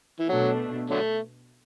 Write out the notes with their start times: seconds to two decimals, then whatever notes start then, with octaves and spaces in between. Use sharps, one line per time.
0.20 E3
0.29 B2 F#3 A3 D4
0.90 D3 F#3 A3